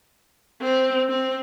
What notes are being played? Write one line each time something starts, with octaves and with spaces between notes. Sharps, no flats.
C4
C4